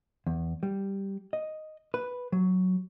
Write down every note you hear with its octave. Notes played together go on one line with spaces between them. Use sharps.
E2
G3
D#5
B4
F#3